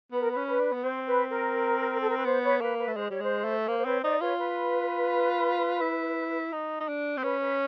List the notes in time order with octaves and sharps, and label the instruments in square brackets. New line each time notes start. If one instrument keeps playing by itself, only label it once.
[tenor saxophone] B3 [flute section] B4
[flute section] A#4
[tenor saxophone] C#4 [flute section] B4
[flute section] B4
[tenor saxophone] D4
B3
[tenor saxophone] C4 [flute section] C5
[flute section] B4
A#4
A4
A#4
B4
[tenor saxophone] B3 [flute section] C5
[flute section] B4 C#5
[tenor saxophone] A#3 [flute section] B4
[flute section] B4
[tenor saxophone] A3
[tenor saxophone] G#3 [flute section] C5
[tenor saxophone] G3 [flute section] C#5
[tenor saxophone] G#3 [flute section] C5
[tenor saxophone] A3
[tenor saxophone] A#3 [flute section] C5
[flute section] C5
[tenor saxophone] C4 [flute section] B4 C#5
[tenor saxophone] D#4 [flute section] C5 D5
[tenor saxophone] F4 [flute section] B4 C#5
[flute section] B4
[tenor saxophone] E4
D#4
D#4
D4
C4
[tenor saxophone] C#4 [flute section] B4
[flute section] B4